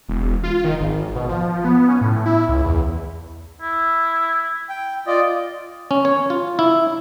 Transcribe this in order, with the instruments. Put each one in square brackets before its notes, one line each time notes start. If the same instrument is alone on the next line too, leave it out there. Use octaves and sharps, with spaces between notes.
[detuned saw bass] E1
F4
D#3
G#1
B2
F3
B3
C#4
A2
E4
C#2
E2
[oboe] E4
[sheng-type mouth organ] G5
[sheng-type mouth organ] F4 D5 [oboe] D#5
[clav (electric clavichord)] C#4
C#5
F4
E4